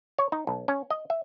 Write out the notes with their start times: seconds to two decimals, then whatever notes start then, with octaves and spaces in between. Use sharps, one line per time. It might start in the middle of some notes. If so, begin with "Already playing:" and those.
0.18 C#5
0.32 D#4
0.47 B1
0.68 C#4
0.90 D#5
1.10 E5